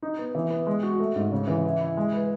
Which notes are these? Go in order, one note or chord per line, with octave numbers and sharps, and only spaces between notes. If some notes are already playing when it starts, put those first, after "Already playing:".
D#4
B3
E3
B3
G#3
F#4
A3
G#2
C#3
E3
E4
E4
G#3
B4